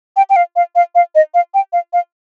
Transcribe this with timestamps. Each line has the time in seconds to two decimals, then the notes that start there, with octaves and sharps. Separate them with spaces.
0.17 G5
0.30 G5
0.36 F5
0.56 F5
0.75 F5
0.95 F5
1.15 D#5
1.34 F5
1.54 G5
1.73 F5
1.93 F5